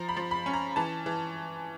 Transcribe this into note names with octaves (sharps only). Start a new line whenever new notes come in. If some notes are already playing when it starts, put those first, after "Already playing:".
Already playing: F3 A#5
B5
F3
B5
C#4
A#5
E3 A5
E3